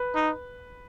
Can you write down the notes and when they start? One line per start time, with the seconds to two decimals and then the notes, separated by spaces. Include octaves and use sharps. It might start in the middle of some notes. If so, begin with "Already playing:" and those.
Already playing: B4
0.15 D#4